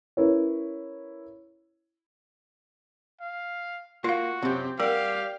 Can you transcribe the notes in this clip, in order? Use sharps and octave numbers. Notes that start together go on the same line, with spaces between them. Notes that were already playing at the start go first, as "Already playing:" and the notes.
C#4 E4 A#4 B4 C#5
F5
A#3 F4 F#4 F5
F#2 C3 C4 G4
G3 G4 A#4 F5 F#5